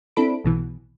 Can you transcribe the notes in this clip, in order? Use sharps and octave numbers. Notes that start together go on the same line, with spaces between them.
C4 D4 E4 A4 B5 D7
B1 B2 E3